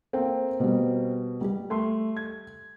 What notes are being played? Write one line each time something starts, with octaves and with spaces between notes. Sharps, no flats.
A#3 C4 A4 F5 G5
B2 G3
G3 G4
A3 C6
G#6